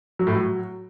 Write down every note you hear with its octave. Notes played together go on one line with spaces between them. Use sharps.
F#3
A2
F#3